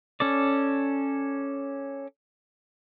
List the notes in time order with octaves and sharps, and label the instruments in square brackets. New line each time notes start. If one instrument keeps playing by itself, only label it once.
[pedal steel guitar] C#4 A4 D5